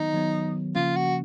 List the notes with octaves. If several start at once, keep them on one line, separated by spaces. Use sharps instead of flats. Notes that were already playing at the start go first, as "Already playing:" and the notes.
Already playing: D#3 F#3 B3 D#4
D#3 F#3 B3
C#3 F3 A#3 C#4 F4
F#4